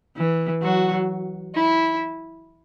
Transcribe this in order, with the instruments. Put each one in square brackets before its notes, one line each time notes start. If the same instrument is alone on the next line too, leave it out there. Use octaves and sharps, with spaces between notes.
[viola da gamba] E3
[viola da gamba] F#3 [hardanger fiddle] F#4
[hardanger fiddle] E4